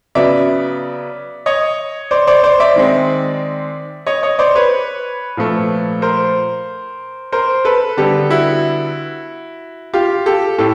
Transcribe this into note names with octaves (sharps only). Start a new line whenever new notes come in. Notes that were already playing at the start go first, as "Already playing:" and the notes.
C#3 F#3 B3 D5 E5
C#5 D#5
C5 D5
C5 D5
C5 D5
D5 E5
D#3 G#3 C4
C#5 D#5
C#5 D#5
C5 D5
B4 C#5
A#2 F3 A3
A#4 C5
A#4 C5
A4 B4
D3 G3 B3 G4 A4
E4 F#4
F4 G4
G4 A4
A2 G4 A4